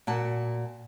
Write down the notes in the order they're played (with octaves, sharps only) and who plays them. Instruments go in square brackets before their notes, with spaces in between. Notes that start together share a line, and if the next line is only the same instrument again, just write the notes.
[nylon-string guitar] A#2 F#4 A5